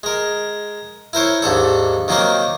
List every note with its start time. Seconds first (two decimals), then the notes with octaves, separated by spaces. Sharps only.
0.03 G#3 A#4
1.13 E4 A#4 C5 C#5
1.42 D#2 G#2 D4 A4
2.08 D#3 F#3 A#3 C4 D#4 A#4